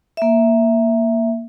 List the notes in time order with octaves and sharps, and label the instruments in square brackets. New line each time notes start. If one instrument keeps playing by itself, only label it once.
[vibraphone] A#3 E5